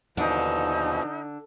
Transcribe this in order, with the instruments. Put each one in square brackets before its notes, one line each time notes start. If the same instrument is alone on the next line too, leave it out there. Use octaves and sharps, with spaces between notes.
[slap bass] D#2 [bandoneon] B2 E3 F3 [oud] D3 [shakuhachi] D#4